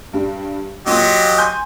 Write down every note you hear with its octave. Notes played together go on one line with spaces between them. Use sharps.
G2 G3
A#2 F#3 G4 D#5 C6
G#5 C6 G6